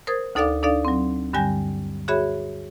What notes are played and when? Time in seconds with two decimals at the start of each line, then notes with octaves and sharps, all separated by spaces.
0.07 A#4 C5 D#6 G#6 A6
0.35 D2 D#4 A4 D5 F5 D6
0.63 D4 D#4 A4 D5 F5
0.85 F#3 C4
1.33 G2 D3 G3 G#5 G6 A#6
2.08 F#4 G#4 C#5 E5 B5